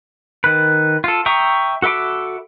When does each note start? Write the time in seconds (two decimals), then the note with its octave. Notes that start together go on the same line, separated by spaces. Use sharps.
0.44 D#3 B4
1.04 F4 A4
1.26 E5 G5 A#5 C#6 D#6
1.82 F#4 A4 E5 B5 D6